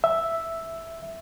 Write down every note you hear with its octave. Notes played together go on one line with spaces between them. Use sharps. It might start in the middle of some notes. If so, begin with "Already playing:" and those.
E5